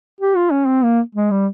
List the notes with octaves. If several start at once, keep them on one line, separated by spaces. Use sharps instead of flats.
G4
F4
C#4
C4
A#3
G#3
G3